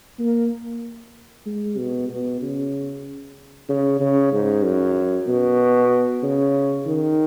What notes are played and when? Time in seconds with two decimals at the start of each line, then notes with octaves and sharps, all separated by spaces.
0.19 A#3
1.46 G#3
1.77 B2
2.09 B2
2.41 C#3
3.68 C#3
4.00 C#3
4.32 G#2
4.63 F#2
5.27 B2
6.23 C#3
6.86 D#3